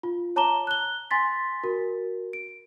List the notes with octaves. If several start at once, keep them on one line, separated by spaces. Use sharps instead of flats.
F4
C#5 A5 A#5 D6 E7 G7
F#6 G7
G#5 C6 A6 B6
F#4 A#4
D7